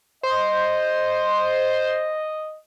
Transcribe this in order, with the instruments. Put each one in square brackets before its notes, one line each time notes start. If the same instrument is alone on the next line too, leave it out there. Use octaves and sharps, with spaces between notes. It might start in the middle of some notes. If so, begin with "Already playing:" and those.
[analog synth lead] C5 [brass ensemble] D#5